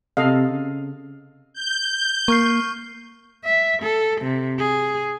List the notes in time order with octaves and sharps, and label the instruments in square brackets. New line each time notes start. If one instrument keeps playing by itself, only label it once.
[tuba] C3 [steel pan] A4 D#5 F5
[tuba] C#3
[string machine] G6
[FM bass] A#3 [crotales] C#6 F6 C7
[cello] E5
A4
C3
G#4